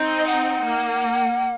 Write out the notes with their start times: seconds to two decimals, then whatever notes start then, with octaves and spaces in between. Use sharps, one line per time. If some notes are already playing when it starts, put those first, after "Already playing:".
Already playing: C4 D#4
0.18 D#5
0.27 F#5
0.63 A#3